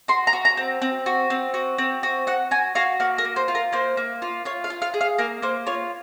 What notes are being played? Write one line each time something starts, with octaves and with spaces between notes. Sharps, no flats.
F#4 C6
A#5
F#4
A#5
C4
C4
F#4
C4
F#4
C4
F#4
F#4 F#5
F#4 G#5
F#4 F5
A#3 F#5
A#4
A#3
C5
F4
A#4
A#3 C5
A#3
F4
F4 C#5
F5
F4
F5
G#4
F5
A#3 A#4
A#3 C5
F4 C#5